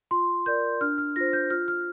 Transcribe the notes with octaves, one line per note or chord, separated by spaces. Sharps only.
F4 C6
A#4 D5 G6
D4 F6
F6
F4 C5 A#6
G6
F4 F6
F6